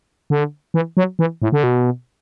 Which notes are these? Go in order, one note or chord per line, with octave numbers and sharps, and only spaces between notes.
D3
E3
F#3
E3
A2
D3
B2